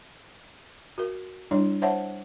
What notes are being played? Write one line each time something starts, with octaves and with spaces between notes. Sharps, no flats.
F#4 A#4
G3 D4 E4 C#5
C5 C#5 E5 F#5 A5